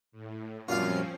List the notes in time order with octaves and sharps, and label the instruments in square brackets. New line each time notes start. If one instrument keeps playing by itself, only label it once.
[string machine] A2
[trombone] F#2 [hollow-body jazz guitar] A#2 G3 [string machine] F3 C4 C#4 [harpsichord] F4 F5